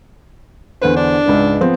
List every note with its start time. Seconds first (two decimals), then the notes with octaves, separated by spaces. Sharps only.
0.81 E2 D3 B4 C5
0.96 D4
1.26 C#2 G#2 B4
1.61 F3 B3 C4